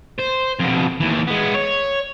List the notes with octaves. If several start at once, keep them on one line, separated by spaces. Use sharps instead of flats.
C5
F2 B2
D#2 E3
G#3 B3
C#5